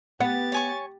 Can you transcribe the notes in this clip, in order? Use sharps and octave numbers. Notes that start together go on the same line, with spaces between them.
B3 G4 F#5 A6
C#5 G#5 C#6